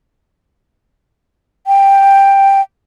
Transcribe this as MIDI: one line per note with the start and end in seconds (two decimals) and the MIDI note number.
1.67 2.61 79